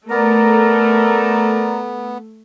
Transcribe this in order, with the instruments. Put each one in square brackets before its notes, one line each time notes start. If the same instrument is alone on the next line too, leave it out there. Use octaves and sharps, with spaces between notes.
[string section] A3 [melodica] B3 [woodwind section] A#4 D5 A#5